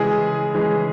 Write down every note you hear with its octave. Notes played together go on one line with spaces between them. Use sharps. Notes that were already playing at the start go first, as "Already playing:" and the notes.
Already playing: C#3 E3 G#3 G#4
C#3 E3 G#3